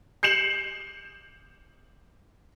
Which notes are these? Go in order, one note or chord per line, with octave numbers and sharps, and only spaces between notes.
G6 C7 C#7 E7 F#7